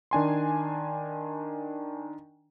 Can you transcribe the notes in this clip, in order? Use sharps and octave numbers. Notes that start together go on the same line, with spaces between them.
D#3 D4 G#5 C6